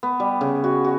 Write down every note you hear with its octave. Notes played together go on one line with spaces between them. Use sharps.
B3
G3
C#3
F#4
F#4